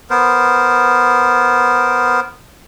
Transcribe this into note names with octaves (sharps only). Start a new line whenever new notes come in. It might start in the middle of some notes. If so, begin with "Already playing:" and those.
B3 A#4 C5